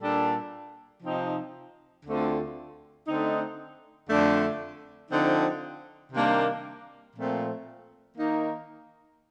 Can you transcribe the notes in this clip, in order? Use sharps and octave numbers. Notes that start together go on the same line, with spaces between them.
A#2 G3 D4 A4
C3 F3 C4 D#4
D2 D3 A3 C4 F4
D3 A3 C4 D#4
F2 D3 A3 D4
D3 F3 C4 D#4
C3 D#3 G3 A#3 D4
A#2 F3 A3 C4
D#3 A#3 D#4